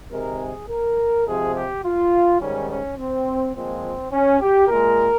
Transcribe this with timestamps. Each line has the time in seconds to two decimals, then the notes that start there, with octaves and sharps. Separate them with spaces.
0.11 C3 D#3 G#3 A#4
0.40 G#4
0.69 A#4
1.26 C3 F3 G#3 G#4
1.54 G4
1.83 F4
2.39 G#2 D#3 G3 C#4
2.69 C#4
2.97 C4
3.54 A#2 F3 G#3 C4
4.12 C#4
4.40 G4
4.68 A#2 G#3 A#4